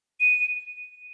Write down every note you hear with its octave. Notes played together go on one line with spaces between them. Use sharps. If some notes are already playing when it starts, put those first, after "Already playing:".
D#7